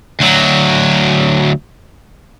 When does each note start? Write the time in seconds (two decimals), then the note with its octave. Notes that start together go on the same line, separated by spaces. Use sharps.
0.20 D2 F#3